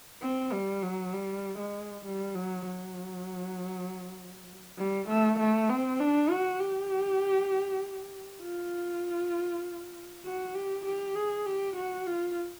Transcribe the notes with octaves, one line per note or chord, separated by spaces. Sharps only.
C4
G3
F#3
G3
G#3
G3
F#3
F#3
G3
A3
A3
C4
D4
F#4
G4
F4
F#4
G4
G4
G#4
G4
F#4
F4